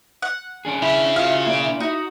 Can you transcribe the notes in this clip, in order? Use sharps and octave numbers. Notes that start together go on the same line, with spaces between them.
F#5
C#4 D4 G#4
C#3 E4
F4 F#4 F5
A#3 D5
D#4 F#4